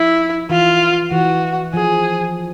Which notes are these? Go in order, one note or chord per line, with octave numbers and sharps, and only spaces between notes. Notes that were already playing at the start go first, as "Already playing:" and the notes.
Already playing: F3 E4
E3 F4
E3 F#4
F3 G#4